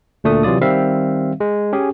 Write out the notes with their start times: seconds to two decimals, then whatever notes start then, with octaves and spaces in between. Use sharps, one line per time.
0.24 D2 A#2 A3 D4 D#6
0.43 C3 E3 F#3 F4 D5 D#6
0.61 D#3 G3 C4 E5 F5
1.40 G#3
1.73 C#4 G4 G#4